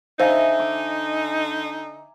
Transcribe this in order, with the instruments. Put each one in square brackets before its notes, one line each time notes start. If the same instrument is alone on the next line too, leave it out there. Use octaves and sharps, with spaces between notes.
[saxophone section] D3 D#4 [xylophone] C5 F5 [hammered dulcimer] E5 G#5 A#5
[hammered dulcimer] D6